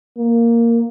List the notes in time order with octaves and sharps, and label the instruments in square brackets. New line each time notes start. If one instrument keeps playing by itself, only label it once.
[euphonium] A#3